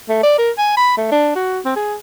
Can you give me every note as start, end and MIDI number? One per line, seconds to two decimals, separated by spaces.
0.09 0.21 57
0.23 0.35 74
0.38 0.51 70
0.58 0.75 80
0.77 0.95 83
0.97 1.10 57
1.12 1.31 62
1.35 1.59 66
1.65 1.75 60
1.76 1.96 68